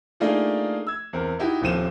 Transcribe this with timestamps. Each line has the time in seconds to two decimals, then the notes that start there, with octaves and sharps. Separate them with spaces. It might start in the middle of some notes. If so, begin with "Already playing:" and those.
0.20 A3 A#3 D4 D#4 F4 G#4
0.87 E6 G#6
1.13 E2 C4 A#4
1.39 D#4 E4 F#4 G4
1.61 D#1 A#2 F3 C4 D#7 E7